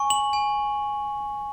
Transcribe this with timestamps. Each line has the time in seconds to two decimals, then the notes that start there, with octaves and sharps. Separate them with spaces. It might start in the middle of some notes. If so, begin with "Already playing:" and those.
Already playing: G#5 C#6
0.10 F#7
0.33 G#5